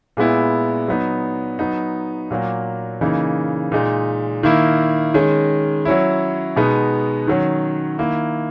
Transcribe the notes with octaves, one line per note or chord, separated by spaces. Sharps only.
A#2 G#3 B3 E4
F#3 B3 D#4
F#3 B3 D#4
A#2 F#3 A#3
C#3 E3 A#3 D#4
A#2 G#3 D#4
D#3 A#3 E4
D#3 G#3 C#4
F#3 C#4 E4
B2 G#3 B3 D#4
D#3 F#3 C#4
D#3 A#3 E4